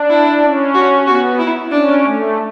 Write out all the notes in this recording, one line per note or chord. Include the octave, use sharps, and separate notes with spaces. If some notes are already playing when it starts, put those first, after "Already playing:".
Already playing: D4
E4
C#4
F#4
B3 F#4
E4
C#4 D4
A3